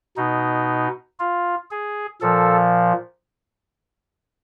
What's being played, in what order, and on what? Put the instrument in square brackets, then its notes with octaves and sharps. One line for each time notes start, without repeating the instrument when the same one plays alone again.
[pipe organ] B2 D#4
F4
G#4
A#2 F3 A4